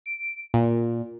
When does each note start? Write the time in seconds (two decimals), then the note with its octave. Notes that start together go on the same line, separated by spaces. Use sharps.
0.06 D7
0.54 A#2